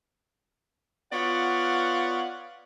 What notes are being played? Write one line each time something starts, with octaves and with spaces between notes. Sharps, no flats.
B3 F4 C#5 D5 F5 F#5